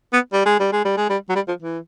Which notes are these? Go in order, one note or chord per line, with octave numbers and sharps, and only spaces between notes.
B3
G3
G#3
G3
G#3
G3
G#3
G3
F#3
G3
F3
E3